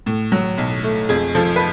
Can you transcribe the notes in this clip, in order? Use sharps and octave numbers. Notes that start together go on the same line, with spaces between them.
A2
F#3
B1
A3
F2 G#4
F3 A4
B4